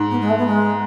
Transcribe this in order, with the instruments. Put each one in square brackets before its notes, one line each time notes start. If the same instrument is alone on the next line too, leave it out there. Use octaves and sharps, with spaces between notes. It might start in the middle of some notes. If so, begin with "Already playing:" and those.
Already playing: [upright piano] G#2
[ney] B3
G#3
A3
B3
G#3